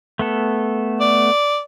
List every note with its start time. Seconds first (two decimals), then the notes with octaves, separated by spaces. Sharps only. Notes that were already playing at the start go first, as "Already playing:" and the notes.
0.19 A3 B3 A4
1.00 D5